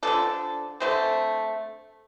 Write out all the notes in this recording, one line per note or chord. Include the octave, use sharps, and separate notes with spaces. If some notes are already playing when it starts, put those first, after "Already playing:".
D3 F3 D4 A4
D3 A3 C4 C5